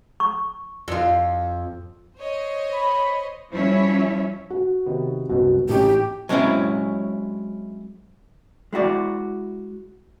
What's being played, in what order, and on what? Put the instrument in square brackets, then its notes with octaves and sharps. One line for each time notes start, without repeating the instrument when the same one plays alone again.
[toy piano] C#6
[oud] F2 F4
[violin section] C5 C#5 D#5
[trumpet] B5
[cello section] F3 G3 C#4 E4 C#5 E5
[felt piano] F#4
[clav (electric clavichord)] C3 D#3 B3
[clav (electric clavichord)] C2 F#2 B2 [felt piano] F#4
[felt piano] A1 [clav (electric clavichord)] C#4 D#4 A4 [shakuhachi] G4
[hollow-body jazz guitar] F#3 G#3 C4 C#4 E4 C#5
G#3 E4 F#4 D5